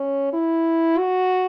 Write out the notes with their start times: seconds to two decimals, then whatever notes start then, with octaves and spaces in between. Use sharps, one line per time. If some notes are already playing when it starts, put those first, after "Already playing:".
Already playing: C#4
0.33 E4
0.98 F#4